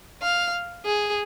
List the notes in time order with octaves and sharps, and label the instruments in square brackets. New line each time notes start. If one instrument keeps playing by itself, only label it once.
[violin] F5
G#4